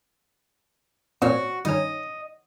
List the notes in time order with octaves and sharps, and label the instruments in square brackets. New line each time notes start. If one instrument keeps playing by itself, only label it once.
[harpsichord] A#2 [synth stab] C4 C#4 [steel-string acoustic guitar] F#4
[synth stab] G2 D#3 C#4 [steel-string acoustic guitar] D#5